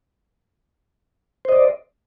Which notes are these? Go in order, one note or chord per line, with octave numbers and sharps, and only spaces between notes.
C5 D5 D#5